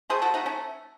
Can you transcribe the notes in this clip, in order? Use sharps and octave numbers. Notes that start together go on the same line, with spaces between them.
A3 G#4 C5
F#4 A4
A3 D#4 F#4
C#4